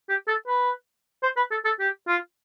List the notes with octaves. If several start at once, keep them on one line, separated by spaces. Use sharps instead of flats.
G4
A4
B4
C5
B4
A4
A4
G4
F4